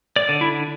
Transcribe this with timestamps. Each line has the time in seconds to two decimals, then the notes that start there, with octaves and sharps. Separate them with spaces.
0.16 D5
0.29 D3
0.41 E4